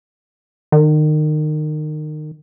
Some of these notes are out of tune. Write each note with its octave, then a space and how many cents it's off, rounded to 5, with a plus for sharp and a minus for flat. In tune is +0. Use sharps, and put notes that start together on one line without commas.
D#3 -30